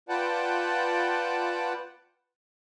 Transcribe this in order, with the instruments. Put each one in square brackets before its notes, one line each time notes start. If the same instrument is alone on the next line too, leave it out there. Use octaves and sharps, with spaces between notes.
[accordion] F4 B4 D5 F#5 G5 A5